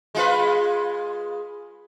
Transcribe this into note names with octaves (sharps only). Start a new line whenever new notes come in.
G#3 F4 B4